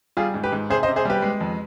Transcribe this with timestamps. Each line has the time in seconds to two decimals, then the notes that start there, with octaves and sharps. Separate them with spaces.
0.17 G3 F4 G#4
0.34 G#2
0.44 G4 B4
0.52 G#2
0.70 C3 G#4 C5
0.83 C5 D#5
0.88 C3
0.96 G#4 C5
1.05 G3 G4 B4
1.22 G#3
1.41 F2